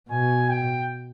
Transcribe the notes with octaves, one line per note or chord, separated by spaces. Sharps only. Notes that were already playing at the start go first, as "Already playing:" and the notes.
B2 G#5
G5